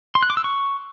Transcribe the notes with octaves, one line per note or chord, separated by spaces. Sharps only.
C6
F#6
D6
E6
C#6